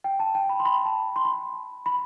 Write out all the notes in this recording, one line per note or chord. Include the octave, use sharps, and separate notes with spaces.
G5
A5
G5
B5
C6
B5
A5
C6
B5
B5